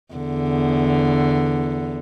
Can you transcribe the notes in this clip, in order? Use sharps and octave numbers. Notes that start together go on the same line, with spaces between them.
E2 D3